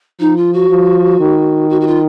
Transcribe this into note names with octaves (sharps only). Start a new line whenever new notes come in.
F3 D#4
F4
F#4
F3
D#3
F#4
F#4
F4